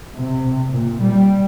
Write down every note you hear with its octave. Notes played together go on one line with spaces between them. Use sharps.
C3
A#2
G3